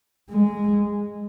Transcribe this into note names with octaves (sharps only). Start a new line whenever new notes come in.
G#3